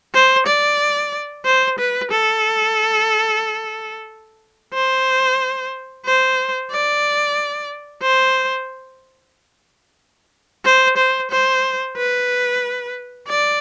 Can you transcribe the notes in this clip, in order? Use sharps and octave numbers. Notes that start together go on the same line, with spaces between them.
C5
D5
C5
B4
A4
C5
C5
D5
C5
C5
C5
C5
B4
D5